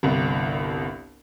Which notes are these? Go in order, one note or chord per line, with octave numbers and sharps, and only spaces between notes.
G1 C2